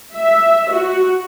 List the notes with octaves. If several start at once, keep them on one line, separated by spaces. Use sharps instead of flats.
E5
F#4